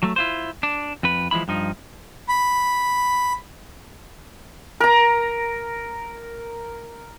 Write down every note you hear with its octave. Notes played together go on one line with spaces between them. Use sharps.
F#3 A3
E4 F4 C5
D4
F2 B4
E3 F3 G#3 E4 B5
G2 F3 D#4
B5
A#4 A#5